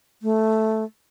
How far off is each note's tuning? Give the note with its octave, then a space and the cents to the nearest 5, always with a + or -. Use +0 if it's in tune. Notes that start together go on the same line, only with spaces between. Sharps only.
A3 -5